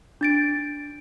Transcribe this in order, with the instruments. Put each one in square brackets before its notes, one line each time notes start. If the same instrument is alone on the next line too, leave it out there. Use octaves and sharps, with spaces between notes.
[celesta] D4 A6 D7